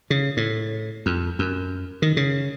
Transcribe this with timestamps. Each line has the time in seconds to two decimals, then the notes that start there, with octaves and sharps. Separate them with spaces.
0.10 C#3
0.37 A2
1.06 F2
1.39 F#2
2.02 D#3
2.17 C#3